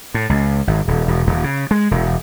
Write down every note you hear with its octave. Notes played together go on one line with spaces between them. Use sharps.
A2
C#2
G#1
D#1
E1
D#1
C#3
G#3
E1